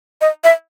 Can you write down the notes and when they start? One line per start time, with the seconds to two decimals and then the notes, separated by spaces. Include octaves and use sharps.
0.21 D#5
0.44 E5